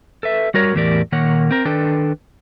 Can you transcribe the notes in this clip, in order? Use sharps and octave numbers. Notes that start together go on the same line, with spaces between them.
A4 B4 E5
G3 F#4 A#4 C#5
E2 A2 E3 G4 A#4 D5
A#2 D#3 A#3 A#4 C#5 F#5
C4 A#4
D#3 D4 A4 B4 G5